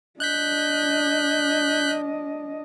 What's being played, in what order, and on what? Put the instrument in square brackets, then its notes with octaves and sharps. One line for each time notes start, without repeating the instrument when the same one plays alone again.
[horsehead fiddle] D4 D#5 [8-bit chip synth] F#6 G6 B6